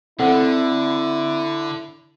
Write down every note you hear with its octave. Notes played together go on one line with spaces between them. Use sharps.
D3 C4 E4 A4 F#5